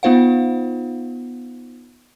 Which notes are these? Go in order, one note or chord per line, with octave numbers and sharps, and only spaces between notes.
B3 D#4 F4 C5 F5 F#5